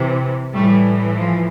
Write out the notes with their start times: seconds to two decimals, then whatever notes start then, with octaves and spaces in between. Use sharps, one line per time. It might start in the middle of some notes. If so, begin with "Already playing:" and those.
Already playing: C3 E3
0.53 A2 E3 G3 A3
1.16 F3